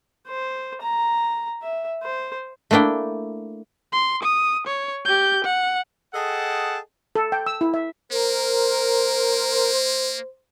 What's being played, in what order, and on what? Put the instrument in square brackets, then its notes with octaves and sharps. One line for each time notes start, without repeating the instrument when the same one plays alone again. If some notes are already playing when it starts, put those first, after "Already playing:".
[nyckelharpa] C5
A#5
E5
C5
[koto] A3 A#3 D4 E4 G5
[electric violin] C6
D#6
C#5
G4 G6
F#5
[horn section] G#4 A4 D#5 F#5 G5 A5
[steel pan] A4
G5
E6
E4
E5
[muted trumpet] A#3 [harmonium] A#4 [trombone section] C5